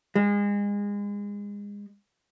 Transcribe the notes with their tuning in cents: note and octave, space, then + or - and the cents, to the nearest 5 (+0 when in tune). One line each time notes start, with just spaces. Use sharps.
G#3 -30